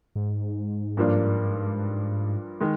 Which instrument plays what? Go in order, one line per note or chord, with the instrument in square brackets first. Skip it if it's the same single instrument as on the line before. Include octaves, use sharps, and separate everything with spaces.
[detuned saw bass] G#2
[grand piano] G2 F3 A#3 D4
D#3 G#3